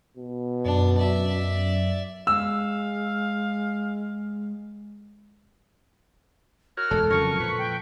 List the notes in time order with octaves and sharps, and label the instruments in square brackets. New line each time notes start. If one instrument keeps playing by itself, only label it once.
[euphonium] B2
[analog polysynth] F#2 [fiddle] D4
[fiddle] D5 E5
[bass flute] G#3 [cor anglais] F5 [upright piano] E6
[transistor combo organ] F#4 A#4 C#5 [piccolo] F6
[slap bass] E1 D2 G#3 [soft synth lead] A4
[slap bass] F2 C#3 F#3 [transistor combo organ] C#4 A#4 [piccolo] C#6
[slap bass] A#2 F3 [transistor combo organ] B4
[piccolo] G5